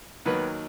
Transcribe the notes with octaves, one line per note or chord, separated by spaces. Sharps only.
D#2 D#3 F#3 B3 B4